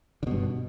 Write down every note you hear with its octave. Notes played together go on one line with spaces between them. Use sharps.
G2 B2 D3